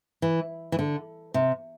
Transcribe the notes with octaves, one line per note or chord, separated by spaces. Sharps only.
E3
E3
D3
C3